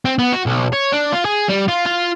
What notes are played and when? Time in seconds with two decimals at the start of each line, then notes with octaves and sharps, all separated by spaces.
0.05 C4
0.19 B3
0.33 F#4
0.46 B1
0.73 C#5
0.92 D4
1.12 F4
1.25 G#4
1.49 G3
1.68 F4
1.86 F4